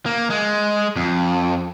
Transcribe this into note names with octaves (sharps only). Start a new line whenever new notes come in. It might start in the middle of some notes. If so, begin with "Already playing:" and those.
A#3
G#3
F2